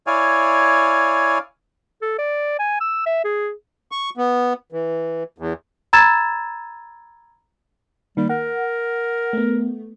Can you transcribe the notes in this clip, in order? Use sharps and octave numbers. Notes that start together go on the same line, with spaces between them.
E4 C#5 D5 F5 G#5
A4
D5
G#5
E6
E5
G#4
C#6
B3
E3
E2
A#5 B5 E6 G#6 A6 E7
D#3 G3 A#3
A#4 F#5
A3 B3